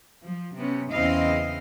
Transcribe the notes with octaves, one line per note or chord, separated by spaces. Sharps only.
F3
C3 B3 C#4
E2 C#3 C4 E4 D#5 F5